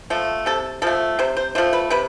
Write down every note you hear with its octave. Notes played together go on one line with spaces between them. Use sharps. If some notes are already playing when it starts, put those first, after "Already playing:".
F3 A3
C3 A4
F3 A3 A4
C3 C5
C5
F3 A3 C5
B4
C3 B4